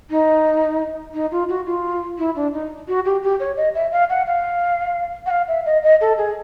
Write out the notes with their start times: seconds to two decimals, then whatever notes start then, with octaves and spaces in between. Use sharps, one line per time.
0.10 D#4
1.14 D#4
1.31 F4
1.49 F#4
1.66 F4
2.18 E4
2.35 D4
2.53 D#4
2.88 F#4
3.05 G4
3.23 G4
3.40 C#5
3.57 D#5
3.74 E5
3.92 F5
4.10 F#5
4.26 F5
5.26 F#5
5.30 F5
5.48 E5
5.66 D#5
5.83 D#5
6.01 A4
6.18 G#4